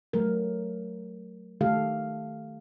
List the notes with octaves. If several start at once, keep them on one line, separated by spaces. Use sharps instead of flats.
F#3 A3 A#4
D#3 A3 G4 A4 F5